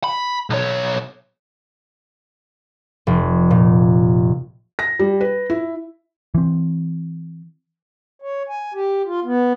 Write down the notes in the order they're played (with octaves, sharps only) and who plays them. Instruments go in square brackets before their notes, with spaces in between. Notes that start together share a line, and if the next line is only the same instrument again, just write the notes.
[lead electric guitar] B5
B1 C#5
[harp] F1
A#2
[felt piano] A#6
G3
B4
E4
[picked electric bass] E3 C4
[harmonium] C#5
G#5
G4
F4
B3